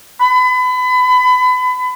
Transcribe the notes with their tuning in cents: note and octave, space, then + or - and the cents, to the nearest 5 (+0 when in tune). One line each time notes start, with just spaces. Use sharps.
B5 +30